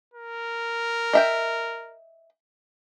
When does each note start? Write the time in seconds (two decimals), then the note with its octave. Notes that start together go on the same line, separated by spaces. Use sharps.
0.14 A#4
1.13 D#5 E5 G5